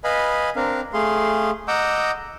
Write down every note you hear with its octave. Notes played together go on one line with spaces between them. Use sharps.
B4 D#5 F5 G#5 B5
C4 D4 A#4 F5
A3 G#4 F5 C6
D#5 F#5 A#5 D6 E6 G6